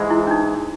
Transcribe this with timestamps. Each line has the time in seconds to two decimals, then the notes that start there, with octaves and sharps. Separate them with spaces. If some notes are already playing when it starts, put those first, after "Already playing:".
Already playing: G#2 E3 G#3
0.10 E4
0.27 D4
0.31 D#4